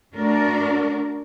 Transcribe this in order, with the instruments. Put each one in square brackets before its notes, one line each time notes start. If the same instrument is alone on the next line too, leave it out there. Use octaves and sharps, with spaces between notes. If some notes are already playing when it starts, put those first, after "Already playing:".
[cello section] A3 D4 F#4 A#4 D5